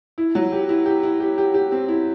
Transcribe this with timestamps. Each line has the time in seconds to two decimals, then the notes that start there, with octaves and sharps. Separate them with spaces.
0.18 E4
0.35 F#3
0.52 G4
0.69 E4
0.86 G4
1.03 E4
1.20 G4
1.38 G4
1.54 G4
1.72 C4
1.88 E4